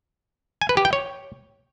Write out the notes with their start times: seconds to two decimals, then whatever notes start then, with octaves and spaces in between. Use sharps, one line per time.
0.61 G#5
0.69 B4
0.77 G4
0.85 G5
0.93 C#5